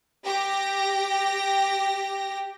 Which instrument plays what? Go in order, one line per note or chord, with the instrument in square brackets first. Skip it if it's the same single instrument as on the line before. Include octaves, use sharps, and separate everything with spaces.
[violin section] G4 A#6